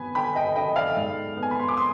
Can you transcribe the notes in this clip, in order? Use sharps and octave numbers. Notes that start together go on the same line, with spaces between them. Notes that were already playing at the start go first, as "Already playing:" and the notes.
Already playing: B3 G#5 B5
D3 G5 B5
D#5 G5
D3 D#5 G5
D5 F5
G#2
B3
G#5
B5
C6
D6
C6 D#6